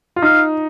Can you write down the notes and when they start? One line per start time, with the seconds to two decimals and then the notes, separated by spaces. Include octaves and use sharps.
0.16 F4
0.22 D#4 F5